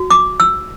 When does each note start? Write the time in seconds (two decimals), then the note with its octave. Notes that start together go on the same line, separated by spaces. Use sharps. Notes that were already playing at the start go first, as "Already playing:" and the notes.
Already playing: F#4
0.10 D6
0.40 E6